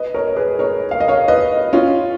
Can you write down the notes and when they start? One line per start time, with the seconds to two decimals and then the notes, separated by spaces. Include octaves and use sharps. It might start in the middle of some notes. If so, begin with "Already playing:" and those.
Already playing: B4 D#5
0.14 A#4 C#5
0.27 C#5
0.36 G#4 B4
0.59 A#4 C#5
0.91 F5
1.00 D#5
1.08 C#5 F5
1.28 B4 D#5
1.73 C#4 F4